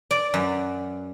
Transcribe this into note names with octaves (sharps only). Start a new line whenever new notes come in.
D5
F#2